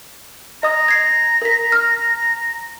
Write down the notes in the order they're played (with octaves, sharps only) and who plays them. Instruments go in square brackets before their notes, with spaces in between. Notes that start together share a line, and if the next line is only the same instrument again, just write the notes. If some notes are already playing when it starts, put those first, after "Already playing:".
[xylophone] D#5 D#6 [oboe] A#5
[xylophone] G#6 C7
A#4 B6
F6